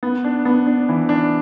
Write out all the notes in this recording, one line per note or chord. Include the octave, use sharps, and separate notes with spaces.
B3
D4
B3
D4
E3
D4